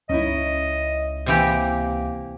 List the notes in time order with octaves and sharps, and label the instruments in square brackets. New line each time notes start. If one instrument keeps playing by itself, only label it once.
[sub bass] C#2 [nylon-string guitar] C#4 D#4 E4 [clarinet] D#5
[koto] C3 E3 G4 [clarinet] A#3